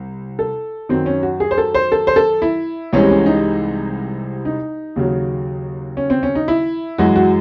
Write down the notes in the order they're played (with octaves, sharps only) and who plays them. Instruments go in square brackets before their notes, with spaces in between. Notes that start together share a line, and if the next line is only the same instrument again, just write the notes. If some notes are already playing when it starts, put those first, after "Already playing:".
Already playing: [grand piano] C2
A4
F#2 D#3 F#3 C4
C#4
F#4
G#4
C5
A4
C5
A4
C5
A4
E4
C2 C3 E3 G#3 C#4
C#4
D#4
D#4
D#2 C#3 F#3
C#4
C4
C#4
D#4
E4
F#2 E3 G#3 F#4
F#4